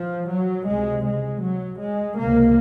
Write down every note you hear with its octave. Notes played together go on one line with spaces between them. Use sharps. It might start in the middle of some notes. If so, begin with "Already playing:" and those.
Already playing: F3
F#3
C#2 C3 G#3
G#3
F#3
G#3
C#2 C3 A#3